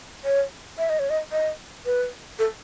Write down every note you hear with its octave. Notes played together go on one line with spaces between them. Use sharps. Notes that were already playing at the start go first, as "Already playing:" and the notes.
C#5
E5
D#5
C#5
D#5
D#5
B4
A4